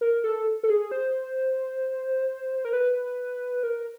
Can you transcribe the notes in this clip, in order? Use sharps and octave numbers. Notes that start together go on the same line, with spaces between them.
A#4
A4
A4
G#4
C5
A#4
B4
A#4